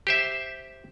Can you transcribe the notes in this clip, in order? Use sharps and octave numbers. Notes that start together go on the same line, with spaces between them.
G4 C5 E5